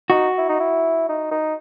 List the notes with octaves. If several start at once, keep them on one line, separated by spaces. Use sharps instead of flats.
D#4 F#4
E4
D#4
E4
D#4
D#4